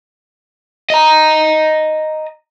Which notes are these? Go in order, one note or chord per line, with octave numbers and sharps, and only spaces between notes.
D#5 A#5